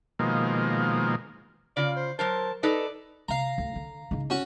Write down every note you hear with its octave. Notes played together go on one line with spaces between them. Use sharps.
B2 D#3 F3 G#3 A#3
C#3 F4 D5
C5
F#3 A#4 C5 A5
D#4 A4 B4 D5
C3 F5 A#5
D2
D3
C#3 D#4
C#4 F#4